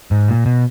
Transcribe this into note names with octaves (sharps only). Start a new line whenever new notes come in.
G#2
A#2
B2